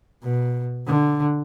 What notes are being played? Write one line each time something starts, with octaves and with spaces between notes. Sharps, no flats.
B2
D3